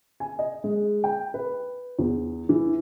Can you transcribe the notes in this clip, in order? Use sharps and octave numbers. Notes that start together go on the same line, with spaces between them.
G#5
D#5
G#3
G5
B4
E2
E3